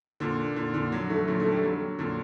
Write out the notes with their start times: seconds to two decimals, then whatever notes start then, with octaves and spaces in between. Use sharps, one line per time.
0.20 A#2 D3
0.56 A#2 D3
0.74 A#2 D3
0.92 D3 F#3
1.09 F#3 A3
1.27 A#2 D3
1.40 A3
1.52 G3
1.63 D3 F#3
1.99 A#2 D3